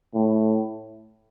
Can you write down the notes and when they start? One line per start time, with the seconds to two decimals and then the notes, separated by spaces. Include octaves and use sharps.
0.14 A2